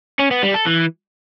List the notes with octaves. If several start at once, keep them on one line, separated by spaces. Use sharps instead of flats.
C#4
B3
G3
A4
E3